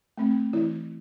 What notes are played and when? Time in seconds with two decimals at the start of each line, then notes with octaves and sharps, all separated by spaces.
0.17 A3 C4
0.53 E3 E4